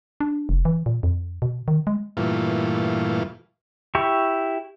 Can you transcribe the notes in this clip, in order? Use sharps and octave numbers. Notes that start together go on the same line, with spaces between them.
D4
F1
E3
A#2
F2
B2
D#3
G#3
G2 A#2 E3 A3 F4
E4 G4 C#6